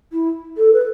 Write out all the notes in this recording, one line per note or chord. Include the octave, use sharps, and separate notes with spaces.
E4
A4
B4